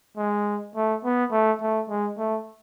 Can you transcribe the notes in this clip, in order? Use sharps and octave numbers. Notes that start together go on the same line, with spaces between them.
G#3
A3
B3
A3
A3
G#3
A3